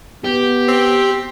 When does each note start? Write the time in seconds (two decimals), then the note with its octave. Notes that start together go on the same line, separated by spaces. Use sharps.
0.24 B3 G4
0.68 C4